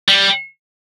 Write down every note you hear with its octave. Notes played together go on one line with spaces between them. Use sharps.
G3